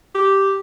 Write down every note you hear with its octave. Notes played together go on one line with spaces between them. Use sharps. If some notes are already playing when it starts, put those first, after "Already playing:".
G4